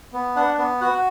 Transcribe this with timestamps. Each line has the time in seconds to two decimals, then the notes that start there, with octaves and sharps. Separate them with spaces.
0.13 B3
0.36 D4 F#5
0.58 B3
0.81 F#4 F#5